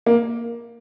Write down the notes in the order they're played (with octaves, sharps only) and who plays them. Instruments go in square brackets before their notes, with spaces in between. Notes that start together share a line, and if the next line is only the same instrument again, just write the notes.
[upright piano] A#3